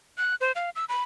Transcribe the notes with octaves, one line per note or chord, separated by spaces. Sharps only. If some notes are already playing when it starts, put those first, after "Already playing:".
F#6
C5
F5
E6
B5